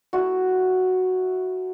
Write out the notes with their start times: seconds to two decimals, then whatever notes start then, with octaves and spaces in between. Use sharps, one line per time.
0.13 A3 E4 F#4